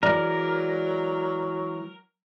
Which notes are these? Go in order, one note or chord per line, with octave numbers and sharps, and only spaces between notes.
E3 F#3 G#3 A#4 D5